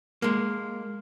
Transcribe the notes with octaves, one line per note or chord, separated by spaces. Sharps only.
G#3 A#3